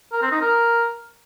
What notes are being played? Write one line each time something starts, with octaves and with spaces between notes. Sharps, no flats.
A#4
C4
D#4
A#4